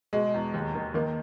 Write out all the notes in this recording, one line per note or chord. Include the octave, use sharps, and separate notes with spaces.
B2 G#3
E2
D#2
D#3
D#3 A#3